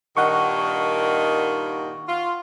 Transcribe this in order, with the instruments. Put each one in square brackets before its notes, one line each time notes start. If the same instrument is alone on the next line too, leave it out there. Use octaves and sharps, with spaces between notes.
[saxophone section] G2 A#2 D#3 [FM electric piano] F#5 C#6
[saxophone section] F4